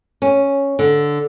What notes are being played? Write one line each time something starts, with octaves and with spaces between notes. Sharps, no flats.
C#4
D3